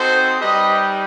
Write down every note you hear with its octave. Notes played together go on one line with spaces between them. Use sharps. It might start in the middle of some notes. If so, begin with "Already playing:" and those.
Already playing: C4 D#4 F#4 A4 C5
G3 D#4 G4 B4 D#5